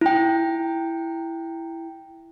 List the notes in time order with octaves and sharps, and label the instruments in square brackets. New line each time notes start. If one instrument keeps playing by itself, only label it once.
[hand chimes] E4 G5